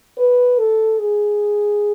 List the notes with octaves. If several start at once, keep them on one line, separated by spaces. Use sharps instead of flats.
B4
A4
G#4